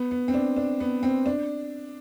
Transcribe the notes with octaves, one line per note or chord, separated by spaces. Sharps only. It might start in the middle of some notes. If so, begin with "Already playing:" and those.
Already playing: B3
B3
C4
D4
D4
B3
C4
D4